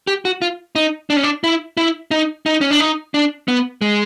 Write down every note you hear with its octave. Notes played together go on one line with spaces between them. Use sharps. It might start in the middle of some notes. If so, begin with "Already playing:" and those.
G4
F#4
F4
D#4
D4
C#4
D4
E4
E4
D#4
D#4
C#4
D4
D#4
D4
B3
G#3